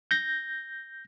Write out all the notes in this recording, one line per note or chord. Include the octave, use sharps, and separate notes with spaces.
G6 A#6